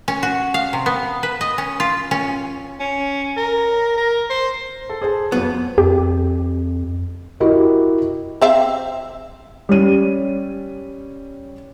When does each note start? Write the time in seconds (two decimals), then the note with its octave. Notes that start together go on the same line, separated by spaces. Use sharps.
0.08 C#4
0.23 F#4
0.54 F5
0.73 C3
0.86 B3
1.23 B4
1.41 D#5
1.58 C#4
1.80 F4
2.11 C#4
2.80 C#4
3.37 A#4
3.97 A#4
4.30 C5
4.90 A4
5.01 G#4 C5 A5
5.32 F2 F#3 B3
5.78 F2 G4
7.40 E4 F#4 G4 A#4 D#5
8.42 C4 E5 F5
9.69 G3 C#4 D#7